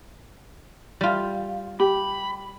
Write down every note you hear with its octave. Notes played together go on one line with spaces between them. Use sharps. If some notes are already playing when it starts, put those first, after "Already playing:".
G3 F4
G4 B5